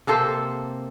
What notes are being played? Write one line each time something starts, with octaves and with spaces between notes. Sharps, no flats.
C3 A#3 A4 C5